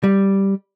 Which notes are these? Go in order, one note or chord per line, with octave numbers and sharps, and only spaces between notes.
G3